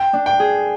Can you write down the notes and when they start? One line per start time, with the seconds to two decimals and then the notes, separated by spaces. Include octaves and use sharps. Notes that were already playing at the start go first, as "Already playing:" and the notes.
Already playing: G5
0.13 D4
0.26 G5
0.39 G#4